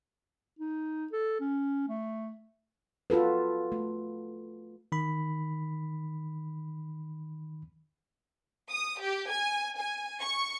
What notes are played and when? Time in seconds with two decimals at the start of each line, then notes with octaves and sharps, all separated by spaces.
0.59 D#4
1.13 A4
1.41 C#4
1.89 A3
3.10 F4 F#4 A4 B4
3.72 A3
4.92 D#3 B5
8.71 D#6
9.01 G4
9.31 G#5
9.78 G#5
10.21 C#6